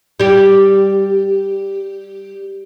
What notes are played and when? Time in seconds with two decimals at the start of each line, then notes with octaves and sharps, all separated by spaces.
0.20 G3 G4